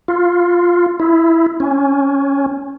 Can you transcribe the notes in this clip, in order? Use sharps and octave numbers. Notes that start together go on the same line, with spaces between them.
F4
E4
C#4